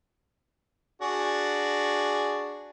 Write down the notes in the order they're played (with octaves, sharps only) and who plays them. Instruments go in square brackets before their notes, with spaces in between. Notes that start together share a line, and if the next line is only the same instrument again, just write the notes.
[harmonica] D4 F#4 G#4